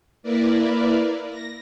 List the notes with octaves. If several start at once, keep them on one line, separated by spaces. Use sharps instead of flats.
A#3 E4 A#4 B4 D5
A#6